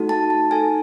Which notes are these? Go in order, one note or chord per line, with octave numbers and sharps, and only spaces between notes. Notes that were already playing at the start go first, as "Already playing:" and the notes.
Already playing: A3 D#4 F#4 A4
A5
A5
D#4 A4 G#5